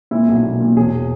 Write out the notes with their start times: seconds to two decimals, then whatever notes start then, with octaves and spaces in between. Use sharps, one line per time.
0.11 A#2 E4
0.28 B1
0.44 A#2
0.60 A#2
0.76 E1 G#4